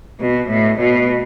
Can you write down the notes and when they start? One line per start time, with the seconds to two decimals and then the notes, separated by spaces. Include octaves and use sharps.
0.19 B2
0.48 A2
0.78 B2